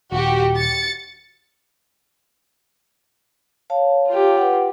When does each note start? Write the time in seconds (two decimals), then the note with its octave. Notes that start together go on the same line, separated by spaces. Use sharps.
0.12 D#1 F#4 G4
0.59 A6 C#7
3.70 C#5 F5 A5
4.09 F4 G4
4.37 B4 F#5